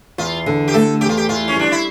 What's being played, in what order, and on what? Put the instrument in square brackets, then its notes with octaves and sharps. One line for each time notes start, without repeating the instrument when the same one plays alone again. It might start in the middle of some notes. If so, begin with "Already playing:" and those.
[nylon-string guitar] E2 [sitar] F4
[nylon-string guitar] D3
[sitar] G4
[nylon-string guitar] A3 [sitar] A4
[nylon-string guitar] E2 [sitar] G4
[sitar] F4
G4
[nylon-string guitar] E3 [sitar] F4
[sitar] C#4
[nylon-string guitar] G3 [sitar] D4
[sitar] E4